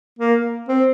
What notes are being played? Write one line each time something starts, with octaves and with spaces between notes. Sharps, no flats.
A#3
C4